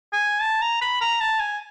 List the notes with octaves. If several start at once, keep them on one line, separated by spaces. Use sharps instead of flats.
G#5
A5
A#5
B5
A#5
A5
G#5